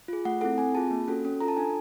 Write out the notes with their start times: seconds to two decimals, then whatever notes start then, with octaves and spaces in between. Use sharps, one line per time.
0.08 F4 G#4
0.25 A3 F#5
0.41 C4 E4 A4 F#5
0.58 C4 G#5
0.75 F4 G#4 A5
0.91 A#3
1.08 C#4 F#4 A4
1.25 C#4
1.40 F4 A4 A#5
1.48 A5
1.57 D4 G#5